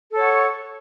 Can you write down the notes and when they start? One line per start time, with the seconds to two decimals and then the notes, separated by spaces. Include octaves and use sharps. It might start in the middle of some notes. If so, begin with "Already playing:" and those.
0.12 A4
0.16 C#5
0.20 F#5
0.23 C#6